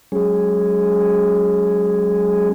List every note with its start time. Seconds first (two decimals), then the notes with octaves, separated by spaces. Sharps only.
0.12 F#3 G#3 C#4 G#4